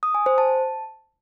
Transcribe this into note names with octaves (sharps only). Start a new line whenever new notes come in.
D#6
G#5
C5
A5